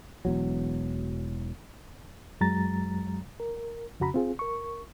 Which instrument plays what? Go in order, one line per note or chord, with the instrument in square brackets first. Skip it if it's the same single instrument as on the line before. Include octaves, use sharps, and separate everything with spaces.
[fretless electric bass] E1 E2 F#3
[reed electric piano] F#2 F#3 G#3 A#5 A6
A#4
F2 C#3 F#4 A#5 B5
C4 F4 G#4
A#4 C#6